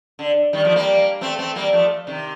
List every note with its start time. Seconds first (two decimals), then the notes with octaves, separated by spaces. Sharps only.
0.19 D3
0.53 D#3 G3
0.65 F3 A3
0.76 G3 A#3
1.21 A3 C4
1.39 A3 C4
1.56 G3 A#3
1.73 F3 A3
2.07 C3 D#3